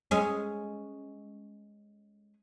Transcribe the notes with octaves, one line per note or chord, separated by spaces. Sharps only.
G#3 C#4